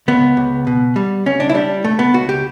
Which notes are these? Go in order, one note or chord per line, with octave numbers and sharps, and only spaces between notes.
C#2 B3
C#2
B2
G3
C#2 C#4
D4
E4
G3 D4
C#2 A3
B3
C#2 F#4
G4